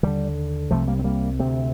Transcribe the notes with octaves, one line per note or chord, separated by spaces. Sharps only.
D#2 D3 D#3 G3
C2 C3 F3 A3
G3 A#3
C4
G3 A#3
D2 C3 A3 C4